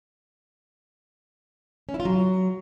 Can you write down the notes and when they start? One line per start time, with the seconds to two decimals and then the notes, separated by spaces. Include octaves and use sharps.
1.89 C#4
1.94 E4
2.00 F4
2.05 F#3